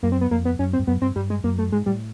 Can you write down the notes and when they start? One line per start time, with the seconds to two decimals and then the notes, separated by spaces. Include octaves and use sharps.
0.03 F#2 A#3
0.12 C4
0.21 B3
0.31 F2 A#3
0.45 B3
0.59 F#2 C#4
0.73 C4
0.79 G2
0.87 F#2 B3
1.01 G2 C4
1.16 G2 G3
1.30 G#3
1.44 F#2 A#3
1.58 A3
1.72 G#2 G#3
1.86 A2 G3